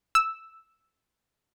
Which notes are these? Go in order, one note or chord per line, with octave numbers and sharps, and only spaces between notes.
E6